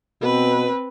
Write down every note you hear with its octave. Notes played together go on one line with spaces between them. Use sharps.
B2 C4 B4